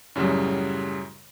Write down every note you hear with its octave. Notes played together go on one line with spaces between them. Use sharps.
F#2 A2 C#3 F#3 G3